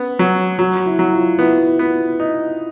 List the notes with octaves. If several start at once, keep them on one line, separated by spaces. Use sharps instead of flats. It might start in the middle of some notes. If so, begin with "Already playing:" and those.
Already playing: B3 C#4
F#3
F#3 F#4
E4
F#3
F4
B3 E4
B3
D#4